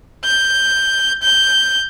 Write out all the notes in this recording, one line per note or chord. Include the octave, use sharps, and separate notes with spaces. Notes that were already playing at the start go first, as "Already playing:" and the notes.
G6
G6